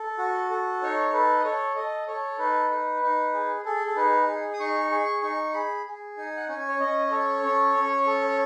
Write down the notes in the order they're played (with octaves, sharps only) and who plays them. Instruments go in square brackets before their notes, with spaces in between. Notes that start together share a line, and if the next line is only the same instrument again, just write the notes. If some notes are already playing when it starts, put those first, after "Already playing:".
Already playing: [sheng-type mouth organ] A4
F#4
A4
D#4 C#5
A4 B4
D#5
A4 C#5
A4 D#5
A4 C#5
D#4 B4
D#4
D#4
G#4
G#4 A4
A4
D#4 B4
G#4
D#6
D#4 C#6
G#4 C#6
D#4 C#6
G#4 B5
G#4
D#4 G#5
F#5
C#4 G#5
C#5
C#4 D#5
D#5
A4 C#5
C#4
C#4
A4
C#5